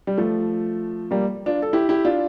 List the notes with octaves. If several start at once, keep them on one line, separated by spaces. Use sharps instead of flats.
G3
F3 A3
G3 A#3
D4 F4
A4
E4 G4
E4 G4
D4 F4